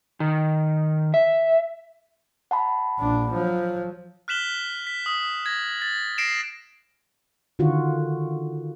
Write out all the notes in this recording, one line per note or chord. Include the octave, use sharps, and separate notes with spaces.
D#3
E5
F#5 A5 B5
A#1 D4
F3 F#3
F6 F#6 B6 E7 F#7 G7
B6
D#6
G#6 A#6
A6
A#6 C7 D7 E7
D3 D#3 F4 F#4